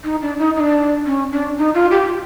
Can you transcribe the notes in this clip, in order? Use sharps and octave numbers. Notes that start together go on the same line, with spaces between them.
D#4
D4
D#4
D#4
D4
C#4
D4
D#4
F4
G4